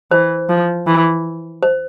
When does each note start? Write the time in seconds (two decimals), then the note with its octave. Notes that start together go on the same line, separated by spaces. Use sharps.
0.11 E3 C5
0.49 F3
0.87 E3
1.63 C5